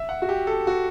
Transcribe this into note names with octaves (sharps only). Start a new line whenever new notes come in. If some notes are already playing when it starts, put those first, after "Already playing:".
Already playing: E5
F#5
F#4
G4
A4
F#4